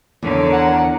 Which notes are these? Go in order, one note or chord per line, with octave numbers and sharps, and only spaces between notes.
E2 D3 A#4 C#5
F#5